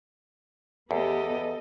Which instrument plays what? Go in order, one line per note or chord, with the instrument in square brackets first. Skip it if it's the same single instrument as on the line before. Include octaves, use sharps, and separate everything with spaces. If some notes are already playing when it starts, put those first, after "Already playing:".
[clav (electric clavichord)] E2 [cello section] B3 G4 [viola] A4 D#5